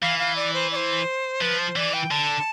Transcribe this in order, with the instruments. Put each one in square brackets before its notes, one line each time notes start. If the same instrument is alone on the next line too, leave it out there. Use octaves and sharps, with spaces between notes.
[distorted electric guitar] E3 [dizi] F5
[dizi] F5
D5
C5
D5
C5
[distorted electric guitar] F3 [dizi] B4
[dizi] C5
[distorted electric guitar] E3 [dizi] D5
[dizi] G5
[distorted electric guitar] D3 [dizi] A5